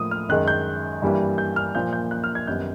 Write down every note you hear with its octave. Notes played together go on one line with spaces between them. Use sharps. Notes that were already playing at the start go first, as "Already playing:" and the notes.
Already playing: A2 F3 A#3 D#6
F6
F#2 D#3 G#3 F#6
G6
G2 E3 G3 A#3
G6
F6
A#2 F3 A#3 G6
G6
F#6
F6
G#6
F#2 D#3 G3 B3 G6